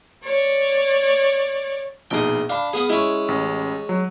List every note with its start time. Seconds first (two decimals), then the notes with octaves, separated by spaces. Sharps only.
0.24 C#5 D5
2.11 A#1 B2 D#4 G#4 G5
2.50 D4 F5 B5
2.73 B3 G#4
2.89 G#3 C#4 E4
3.28 A1
3.89 F#3